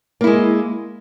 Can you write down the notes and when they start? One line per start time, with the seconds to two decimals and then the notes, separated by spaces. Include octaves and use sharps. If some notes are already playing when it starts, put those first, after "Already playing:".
0.21 A#3
0.24 E4
0.27 G#3